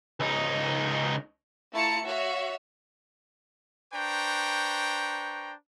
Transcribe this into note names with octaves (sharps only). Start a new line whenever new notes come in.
C#2 D#4
A3 E4 F4 A5 A#5 C#7
F#4 C#5 E5 F5
D4 B4 C5 G5 A#5 C#6